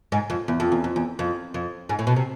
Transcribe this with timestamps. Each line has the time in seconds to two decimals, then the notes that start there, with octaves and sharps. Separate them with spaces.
0.12 G#2
0.30 F2
0.48 E2
0.60 F2
0.72 E2
0.84 F2
0.96 E2
1.19 F2
1.54 F2
1.89 G#2
1.99 A2
2.07 B2
2.16 C3